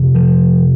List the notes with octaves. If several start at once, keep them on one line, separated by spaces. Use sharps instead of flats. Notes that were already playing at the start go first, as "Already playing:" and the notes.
Already playing: F2 C3
F3